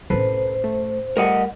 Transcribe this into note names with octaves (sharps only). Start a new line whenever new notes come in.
C2 A2 C#4 A4 B4 C5
A3
G3 A3 A#4 D#5 F#5